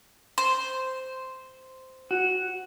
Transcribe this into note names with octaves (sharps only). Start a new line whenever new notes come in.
C5
F#4